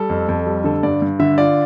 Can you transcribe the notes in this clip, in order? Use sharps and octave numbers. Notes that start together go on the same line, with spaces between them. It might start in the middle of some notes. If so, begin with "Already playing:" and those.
Already playing: G3 A4
F2
F2
G3
D3 A4
G2 D5
G2
D3 E5
F4 D5